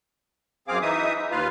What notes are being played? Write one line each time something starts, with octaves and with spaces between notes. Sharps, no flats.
F#2 C4 G#4 F5 D6
E3 D#4 E5 D#6
D#2 F4 B4 F5